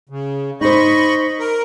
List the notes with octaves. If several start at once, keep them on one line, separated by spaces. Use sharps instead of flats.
C#3
D#4 C5 D#5 B5 C#6
A#4